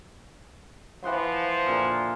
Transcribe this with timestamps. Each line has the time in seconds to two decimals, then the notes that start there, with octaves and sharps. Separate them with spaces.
1.04 E3 F3 F#5 C6
1.66 A#2 D3 A#4